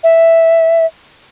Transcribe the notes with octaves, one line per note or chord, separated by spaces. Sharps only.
E5